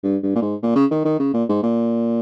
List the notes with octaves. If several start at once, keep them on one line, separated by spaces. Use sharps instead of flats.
G2
G2
A#2
G#2
A#2
C#3
D#3
D#3
C#3
A#2
G#2
A#2